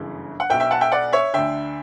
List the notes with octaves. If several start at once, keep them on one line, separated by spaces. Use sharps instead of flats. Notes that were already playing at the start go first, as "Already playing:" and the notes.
Already playing: G1 F#2 C#3 E3
F#5
B1 B2 E5 G5
E5 G5
F#5 A5
E5 G5
D5 F#5
C#5 E5
D2 D3 E5 G5